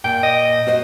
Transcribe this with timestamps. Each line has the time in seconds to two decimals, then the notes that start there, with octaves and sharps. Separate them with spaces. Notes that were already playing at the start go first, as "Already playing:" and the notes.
0.04 A#2 G5
0.23 D#5
0.67 F#4 C5 D#5